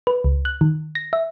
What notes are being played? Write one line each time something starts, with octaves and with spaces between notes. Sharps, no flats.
B4
C#2
F#6
D#3
A#6
E5